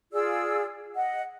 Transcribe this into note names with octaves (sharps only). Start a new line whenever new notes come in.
F4 G#4 D5 E6
D#5 F#5